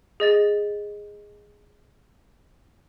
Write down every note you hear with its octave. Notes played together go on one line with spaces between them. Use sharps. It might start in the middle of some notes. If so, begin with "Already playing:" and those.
G#4 D#5 A6